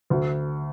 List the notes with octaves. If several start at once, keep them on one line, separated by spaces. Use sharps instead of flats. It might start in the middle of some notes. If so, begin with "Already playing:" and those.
D2